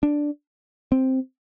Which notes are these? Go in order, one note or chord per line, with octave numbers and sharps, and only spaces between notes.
D4
C4